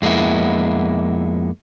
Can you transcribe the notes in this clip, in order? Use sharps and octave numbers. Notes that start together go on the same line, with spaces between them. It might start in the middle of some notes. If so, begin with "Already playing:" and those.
F2 G#3 A#3 B3 E4